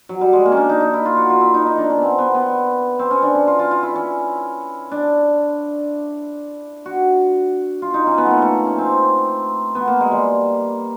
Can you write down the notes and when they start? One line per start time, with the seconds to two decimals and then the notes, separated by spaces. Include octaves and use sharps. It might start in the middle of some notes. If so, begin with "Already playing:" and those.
0.09 F#3
0.21 G3
0.33 G#3
0.46 A#3
0.52 C#4
0.57 D4
0.69 D#4
0.81 D#4
0.94 E4
1.06 F4
1.17 F#4
1.30 F4
1.41 E4
1.54 D#4
1.66 D#4
1.78 D4
1.90 C#4
1.98 B3 C4
2.18 B3
2.34 B3
2.99 C4
3.11 C#4
3.22 D4
3.35 C#4
3.47 F4
3.59 F4
3.71 F4
3.83 E4
3.96 C#4
4.92 D4
6.86 F#4
7.82 F4
7.94 D#4
8.07 C#4
8.18 B3
8.26 A3 A#3
8.42 A3
8.67 C#4
8.78 C4
9.75 B3
9.88 A#3
10.00 G#3
10.12 G3